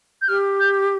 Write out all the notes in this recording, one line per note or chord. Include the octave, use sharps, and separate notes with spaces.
G6
G4 F6
G6